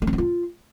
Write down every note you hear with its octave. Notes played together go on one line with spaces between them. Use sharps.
A#3
C#4
C4
F4